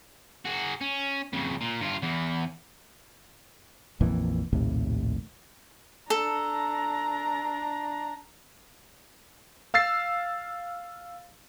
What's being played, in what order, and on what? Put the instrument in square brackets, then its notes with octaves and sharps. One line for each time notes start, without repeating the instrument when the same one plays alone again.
[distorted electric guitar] F#4 G#4
C#4
F2 C#3
A#2
G2 F4
E2 E3
[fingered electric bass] A#1 F2 A#2 E3
A#1 D#2 A2 C3
[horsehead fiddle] D4 A#5 [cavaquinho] A4
[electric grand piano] F5 E6 A6 C7